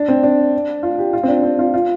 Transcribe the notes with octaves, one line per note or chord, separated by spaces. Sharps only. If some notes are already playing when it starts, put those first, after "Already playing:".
Already playing: D4
C4
D4
F4
G4
F4
C4
D4
C4
F4
F4